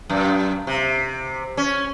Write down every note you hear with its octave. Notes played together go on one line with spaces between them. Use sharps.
F#2
C3
C#4